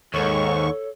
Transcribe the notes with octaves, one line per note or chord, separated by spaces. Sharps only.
D#2 G#2 A4 C#5 C#6